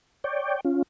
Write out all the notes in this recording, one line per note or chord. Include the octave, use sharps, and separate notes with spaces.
C#5 D5 G5
C#4 F4